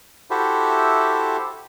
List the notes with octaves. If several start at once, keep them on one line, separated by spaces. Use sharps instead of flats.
E4 F#4 G4 A4 C5 E5